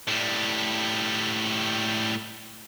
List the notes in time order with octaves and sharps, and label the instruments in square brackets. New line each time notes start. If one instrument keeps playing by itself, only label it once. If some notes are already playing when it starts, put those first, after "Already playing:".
[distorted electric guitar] A2 G3